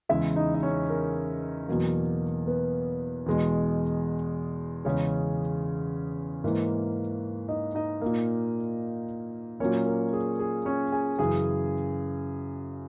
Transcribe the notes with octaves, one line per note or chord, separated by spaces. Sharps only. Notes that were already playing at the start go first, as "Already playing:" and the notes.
E2 C#3 G#3 E4 E5
D#4 D#5
D#5
C#4 C#5
A#4
E2 B2 F#3 A#3
B3 B4
E2 B2 G#3
E2 C#3 G#3 C#4 C#5
G#2 E3 A#3
D#4 D#5
D#4 D#5
A#2 A#3
A#2 F#3 A#3 C#4 C#5
A#4
G#4
G#4
C#4 C#5
G#4 G#5
F#2 C#3 E3 G#4 G#5